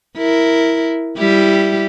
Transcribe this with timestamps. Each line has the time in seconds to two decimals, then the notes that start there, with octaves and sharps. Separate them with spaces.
0.17 E4 A#4
1.18 G3 E4 G4